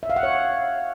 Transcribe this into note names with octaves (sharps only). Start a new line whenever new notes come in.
E5
F5
F#5
C#5